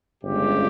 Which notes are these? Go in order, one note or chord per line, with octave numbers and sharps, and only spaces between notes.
G1 F2 C#3 G#3 G4